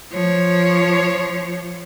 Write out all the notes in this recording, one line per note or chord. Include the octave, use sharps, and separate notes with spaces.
F3 C#5